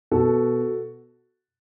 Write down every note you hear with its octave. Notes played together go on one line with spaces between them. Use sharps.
B2 F#4 A4